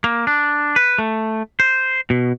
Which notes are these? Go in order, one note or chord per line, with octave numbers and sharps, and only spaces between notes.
A#3
D4
B4
A3
C5
B2